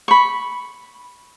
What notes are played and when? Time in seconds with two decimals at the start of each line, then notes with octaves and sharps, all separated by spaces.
0.08 B5 C#6